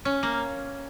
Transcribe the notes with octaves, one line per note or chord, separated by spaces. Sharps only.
C#4
A#3